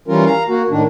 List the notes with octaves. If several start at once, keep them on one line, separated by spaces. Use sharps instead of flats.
E3 G3 C#4 F4 A#4
F5 A#5
A#3 F#4
A2 D#3 D4